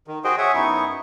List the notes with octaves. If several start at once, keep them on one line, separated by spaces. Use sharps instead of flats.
D#3
F#4 G#4 C5 D#5 G5
C#5 E5 F#5 G#5
F#2 B3 D#4 E4 C#6